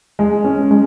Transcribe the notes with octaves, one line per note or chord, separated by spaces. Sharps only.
G#3
C#4
G#3